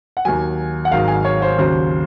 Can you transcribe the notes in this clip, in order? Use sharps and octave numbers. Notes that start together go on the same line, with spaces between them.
F#5
D#2 D#3 F#3 G#5
F#5
G#1 G#2 D#3 F#3 F5
G#5
C#5
C5
D#2 C#3 F#3 C5